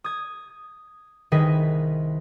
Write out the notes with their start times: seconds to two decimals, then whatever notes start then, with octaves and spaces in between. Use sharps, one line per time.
0.04 D#6 G#6
1.32 C2 D#3 G#4 B4 D#5 B6